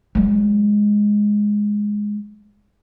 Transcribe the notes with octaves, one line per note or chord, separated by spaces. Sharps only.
F#3 G#3